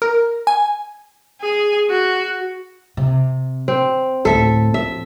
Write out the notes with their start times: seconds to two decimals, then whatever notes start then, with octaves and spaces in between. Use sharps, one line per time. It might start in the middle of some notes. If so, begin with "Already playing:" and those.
0.02 A#4
0.47 G#5
1.42 G#4
1.90 F#4
2.97 C3
3.68 C4
4.25 D2 A2 A4 E5
4.74 F3 E5